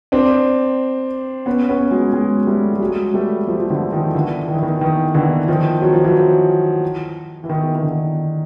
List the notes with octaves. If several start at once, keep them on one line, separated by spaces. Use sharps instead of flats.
C4 D4
B3 C#4
B3 C#4
F#3 G#3
F#3 G#3
G3 A3
G3
F#3 G#3
G3 A3
F3 G3
F3
D3 E3
D#3 F3
D3 E3
D#3
E3
D#3
E3
D#3
D3 E3
D#3 F3
F#3
F3
E3 F#3
E3
D#3
D#3
D3